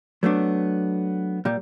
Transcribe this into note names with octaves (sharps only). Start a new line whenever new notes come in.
F#3 A3 B3 D4
A#2 G3